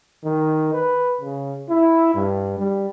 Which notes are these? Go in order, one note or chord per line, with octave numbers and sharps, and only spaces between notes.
D#3
B4
C#3
E4
G2
G3